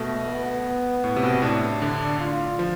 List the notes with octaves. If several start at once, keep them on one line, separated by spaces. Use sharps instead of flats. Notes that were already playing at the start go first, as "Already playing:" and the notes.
Already playing: B2 A3
B3
A2
C3
B2
A2 D4
D3
F4
F3